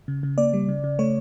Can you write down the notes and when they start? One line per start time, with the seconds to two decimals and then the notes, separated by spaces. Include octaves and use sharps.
0.08 C#3
0.23 C#3
0.38 A#3 D5
0.53 G3
0.69 C#3
0.84 C#3
0.99 A3 C#5